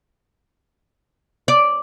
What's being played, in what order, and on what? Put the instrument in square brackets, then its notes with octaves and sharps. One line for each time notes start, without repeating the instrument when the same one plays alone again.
[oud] D5